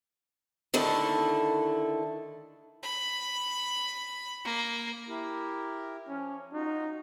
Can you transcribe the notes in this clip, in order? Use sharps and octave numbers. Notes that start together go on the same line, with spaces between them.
D3 D#3 A3 E4
B5
A#3
E4 G4 A#4
F3 C#4
D#4 F4 F#4